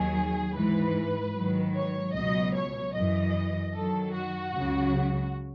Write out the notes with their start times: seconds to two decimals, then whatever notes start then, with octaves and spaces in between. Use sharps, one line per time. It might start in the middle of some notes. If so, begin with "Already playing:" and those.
Already playing: D#2 D#3 F#3 G#4
0.55 G#2 E3 B4
1.35 G#2 D#3 F#3
1.75 C#5
2.14 C#2 B2 F#3 D#5
2.55 C#5
2.95 F#2 E3 D#5
3.74 F#2 D#3 F#3 A4
4.14 F#4
4.54 C#2 C#3 F#3